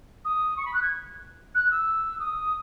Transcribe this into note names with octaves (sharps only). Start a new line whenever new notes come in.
D#6
C#6
B5
F#6
G#6
F#6
E6
D#6